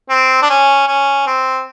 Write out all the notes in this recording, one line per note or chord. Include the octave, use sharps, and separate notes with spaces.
C4
D4
C#4
C#4
C4